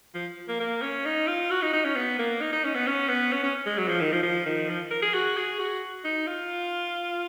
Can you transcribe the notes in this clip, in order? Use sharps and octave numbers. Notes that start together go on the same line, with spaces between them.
F3
A#3
A#3
C#4
D#4
F4
F#4
D#4
D#4
C#4
B3
A#3
D#4
D#4
C#4
B3
C#4
B3
C#4
C#4
G#3
F#3
F3
D#3
F3
F3
D#3
F3
A#4
G#4
F#4
G#4
F#4
D#4
F4